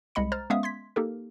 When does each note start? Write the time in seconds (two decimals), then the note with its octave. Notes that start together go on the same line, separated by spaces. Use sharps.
0.15 C2 G#3 D#5 B5 C#7
0.32 C5 A#5 F6 A6
0.50 G#3 B3 C#4 E5 F5 D#6
0.63 C6 G#6 B6
0.96 A#3 D#4 G4 A4 A#4